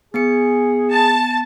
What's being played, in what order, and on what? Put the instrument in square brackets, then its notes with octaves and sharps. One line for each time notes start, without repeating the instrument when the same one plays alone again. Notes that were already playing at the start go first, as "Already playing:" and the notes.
[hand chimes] B3 G#5 C#7 [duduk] G#4
[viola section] A5